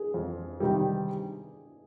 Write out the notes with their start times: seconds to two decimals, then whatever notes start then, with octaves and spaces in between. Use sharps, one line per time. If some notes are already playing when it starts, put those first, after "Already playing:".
Already playing: G#4
0.14 F2
0.60 C3 D#3 G3